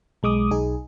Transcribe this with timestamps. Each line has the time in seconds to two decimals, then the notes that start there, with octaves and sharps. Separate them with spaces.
0.23 B1 G#3 D6 D#6
0.51 B1 D#4 G#4